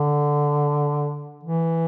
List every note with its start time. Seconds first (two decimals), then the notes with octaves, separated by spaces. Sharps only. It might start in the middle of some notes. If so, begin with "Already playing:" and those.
Already playing: D3
1.43 E3